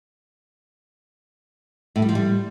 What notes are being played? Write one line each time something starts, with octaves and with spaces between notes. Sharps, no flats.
A2
G3
F3
G3